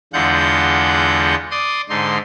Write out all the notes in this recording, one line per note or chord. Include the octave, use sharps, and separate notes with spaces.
E2 D3 G#3 F4 F#5 G6
D5 C6 D#6
G#2 D3 D#4 C6